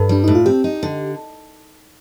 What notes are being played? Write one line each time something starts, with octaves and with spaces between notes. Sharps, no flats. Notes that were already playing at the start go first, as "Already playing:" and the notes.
Already playing: G2 A4
G3 D4
A2 D#4
F4
C4 G4
D#4
D3